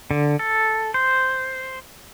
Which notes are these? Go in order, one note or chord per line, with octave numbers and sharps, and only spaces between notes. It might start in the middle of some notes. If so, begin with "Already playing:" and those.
D3
A4
C5